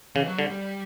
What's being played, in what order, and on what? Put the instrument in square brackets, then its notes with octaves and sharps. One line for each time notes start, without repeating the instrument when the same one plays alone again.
[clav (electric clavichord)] C#3 [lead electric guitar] E3
[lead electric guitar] F#3
[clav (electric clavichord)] D3 [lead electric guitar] G3
[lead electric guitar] G3